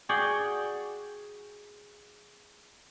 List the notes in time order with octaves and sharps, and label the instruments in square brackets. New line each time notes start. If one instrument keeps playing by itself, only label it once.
[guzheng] F#4 G#4 D5 F#5 G5